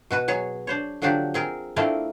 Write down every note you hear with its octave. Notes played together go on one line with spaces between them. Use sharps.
B2 F#4 B4
F#3 G#4 C#5
D4 C5 C#5
D3 F3 F#3 D4 F#4 G4
C4 G#4 A#4
A3 C4 D4 E4 F4 A#4